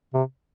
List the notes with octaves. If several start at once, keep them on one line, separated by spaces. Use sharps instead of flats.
C3